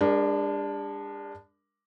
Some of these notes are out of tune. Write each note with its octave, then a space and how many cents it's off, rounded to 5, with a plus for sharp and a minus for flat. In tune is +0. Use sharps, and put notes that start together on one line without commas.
G#3 -45 D4 +0 A#4 +10